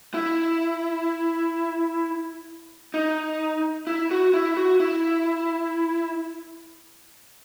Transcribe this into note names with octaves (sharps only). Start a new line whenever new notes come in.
E4
D#4
E4
F#4
E4
F#4
E4